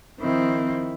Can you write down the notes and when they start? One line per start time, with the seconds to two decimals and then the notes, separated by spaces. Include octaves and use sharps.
0.20 D#3 F3 C4 E4